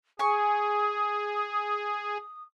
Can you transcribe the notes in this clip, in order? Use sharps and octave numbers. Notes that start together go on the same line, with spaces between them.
G#4 G#5 C#6 D#6